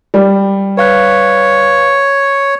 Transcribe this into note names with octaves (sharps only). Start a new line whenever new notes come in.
G3
B4 C#5 F5 F#6